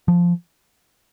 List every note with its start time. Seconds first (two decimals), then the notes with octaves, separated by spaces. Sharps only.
0.08 F3